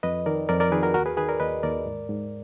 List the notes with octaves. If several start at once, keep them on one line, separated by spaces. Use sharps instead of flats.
F2 B4 D#5
D#3 A#4 D5
F2 A#4 D5
A#4 D5
D#3 G#4 B4
F#4 A#4
D#2 F#4 A#4
G#4 B4
D#3 G#4 B4
A#4 D5
D#2 B4 D#5
D#2 A#4 D5
G#2
G#2